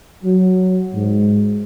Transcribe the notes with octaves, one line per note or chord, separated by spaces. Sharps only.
F#3
G#2